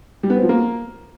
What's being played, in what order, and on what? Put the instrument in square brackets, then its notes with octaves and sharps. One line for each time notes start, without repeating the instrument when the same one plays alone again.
[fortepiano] G3
B3
C4
F3
A#3